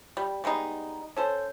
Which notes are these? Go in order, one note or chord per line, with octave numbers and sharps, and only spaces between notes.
G3
G3 G#3 B3 D#4
C#4 A4 C5